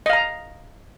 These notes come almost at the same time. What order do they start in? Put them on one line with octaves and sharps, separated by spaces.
D#5 F5 A#5